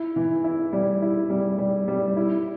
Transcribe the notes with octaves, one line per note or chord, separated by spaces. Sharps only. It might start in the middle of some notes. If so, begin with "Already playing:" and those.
Already playing: E4
E3
E4
G3
E4
G3
G3
G3
E4